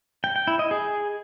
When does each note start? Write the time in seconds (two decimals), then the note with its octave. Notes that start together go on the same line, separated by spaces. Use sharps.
0.24 G5
0.36 G5
0.47 E4
0.59 D#5
0.71 G#4